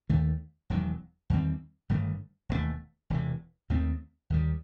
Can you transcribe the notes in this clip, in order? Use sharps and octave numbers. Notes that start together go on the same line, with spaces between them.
D#2 D#3 A3
E1 E2 D#3 F#3
E2 D#3 G3 C4
G1 G2 D#3 A3
E1 D#2 D#3 A3
E1 E2 C3 E3
D#2 D#3 A3 C4
D#2 D#3 G3